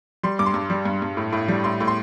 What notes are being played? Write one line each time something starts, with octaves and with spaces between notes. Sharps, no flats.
G3 C6
G2 D6
C6
G2
G3
G2
G2
A2
A2
G3
A2 C6
A2
C6